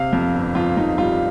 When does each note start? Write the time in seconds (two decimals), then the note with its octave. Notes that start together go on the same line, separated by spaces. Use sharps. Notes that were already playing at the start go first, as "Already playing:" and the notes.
Already playing: C3 F5
0.13 F2
0.34 G1
0.55 F2 F4
0.77 F2 D#4
0.98 G3 F4